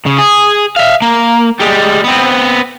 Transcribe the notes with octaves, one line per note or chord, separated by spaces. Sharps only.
C#3
G#4
E5 F5
A#3
G3 G#3
B3 C4